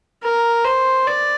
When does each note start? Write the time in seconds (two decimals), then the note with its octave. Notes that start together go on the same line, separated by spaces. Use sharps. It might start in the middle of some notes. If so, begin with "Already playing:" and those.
0.24 A#4
0.65 C5
1.07 D5